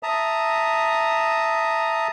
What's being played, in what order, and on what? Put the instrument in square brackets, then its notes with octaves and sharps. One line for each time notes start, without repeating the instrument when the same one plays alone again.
[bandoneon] E5 A5 A#5 D#6